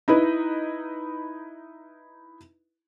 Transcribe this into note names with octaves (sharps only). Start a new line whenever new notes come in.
D#4 E4 B4